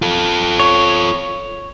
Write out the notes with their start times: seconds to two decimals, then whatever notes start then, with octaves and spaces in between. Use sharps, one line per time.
0.02 F4 A4
0.60 C#5